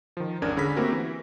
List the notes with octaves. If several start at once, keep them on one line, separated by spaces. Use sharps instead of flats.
D#3 F3
G#1 E2 C#4 D4 A#4 G#6
D3 C#4 G#4 B5 A#6 B6
A3 A#3 C4 F#4 G4 A#4
E3